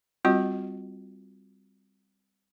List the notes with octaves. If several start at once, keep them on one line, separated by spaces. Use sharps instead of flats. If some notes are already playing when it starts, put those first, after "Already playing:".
G3 C4 F4 F#4 D#5